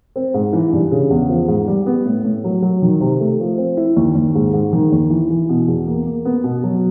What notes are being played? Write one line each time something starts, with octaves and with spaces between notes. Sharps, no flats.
C4
G#2
E3
G2
C#3
E2
F3
G#2
G3
B3
A2
A2
F#3
F#3
D#3
C3
A3
F3
C4
E4
D#2
D#2
G#2
G#2
D#3
D#2
E3
E3
B2
E2
A#3
A#3
B3
B2
F#3